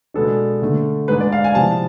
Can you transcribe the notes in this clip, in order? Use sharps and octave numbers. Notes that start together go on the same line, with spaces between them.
B2 G#3 B3 D4 A4
D3 A3 D4
G#2 G#3 D4 B4
D5
F5
G#5
C3 F3 B3 E4 A5